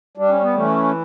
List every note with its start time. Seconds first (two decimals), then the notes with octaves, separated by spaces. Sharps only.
0.17 G3 D4
0.30 C#4
0.42 B3
0.54 E3 A3 C#4